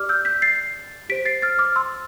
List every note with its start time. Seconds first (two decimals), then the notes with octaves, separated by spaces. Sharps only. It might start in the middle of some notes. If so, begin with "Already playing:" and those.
Already playing: G4 D5 D6 F6
0.09 E6 G6
0.25 G6 B6
0.42 A6 C7
1.09 G4 C5 B6 D7
1.25 A6 C7
1.42 F6 A6
1.59 D6 F6
1.76 C6 E6